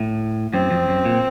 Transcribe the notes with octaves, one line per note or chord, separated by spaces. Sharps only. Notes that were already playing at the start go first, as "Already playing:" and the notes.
Already playing: A2
F#2 C4
F2
F#2
A#2